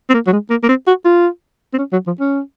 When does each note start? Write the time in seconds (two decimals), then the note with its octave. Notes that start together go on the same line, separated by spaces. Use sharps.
0.10 C4
0.14 A#3
0.27 F#3
0.32 G#3
0.50 A#3
0.63 A#3
0.69 C4
0.87 F#4
1.05 F4
1.73 C4
1.79 C#4
1.93 F#3
2.07 F3
2.20 C#4